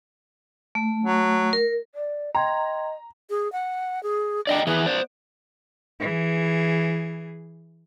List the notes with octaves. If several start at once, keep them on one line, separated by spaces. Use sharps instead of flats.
A3
F#3
A#4
D5
D#5 G5 A#5 C6 G#6
G#4
F#5
G#4
D4 D5 D#5 G5
E3 B3 G#4
C5 D5
E3 G#4